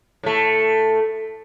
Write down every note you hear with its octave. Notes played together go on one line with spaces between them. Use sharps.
A2 A3